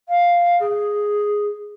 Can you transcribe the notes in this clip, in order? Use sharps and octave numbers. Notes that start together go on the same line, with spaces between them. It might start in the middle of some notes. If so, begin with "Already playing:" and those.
F5
G#4